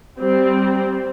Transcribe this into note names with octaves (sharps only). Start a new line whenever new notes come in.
G3 C4